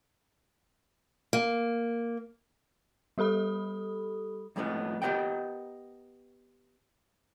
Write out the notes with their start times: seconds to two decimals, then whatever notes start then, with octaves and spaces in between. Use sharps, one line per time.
1.33 A#3
3.18 G3 G4 A4 B5 D#6
4.56 F2 A2 G#3 B3 C#4
5.02 B3 G4 A#4 D#5 F#5 G5